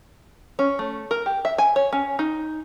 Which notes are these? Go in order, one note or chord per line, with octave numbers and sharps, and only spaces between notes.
C#4
A3
A#4
G4
E5
G#5
C#5
C#4
D#4